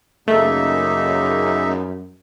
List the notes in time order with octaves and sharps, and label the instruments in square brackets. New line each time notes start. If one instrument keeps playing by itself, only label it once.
[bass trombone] F#2 [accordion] C#3 A#3 D#4 [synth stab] A3 [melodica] E5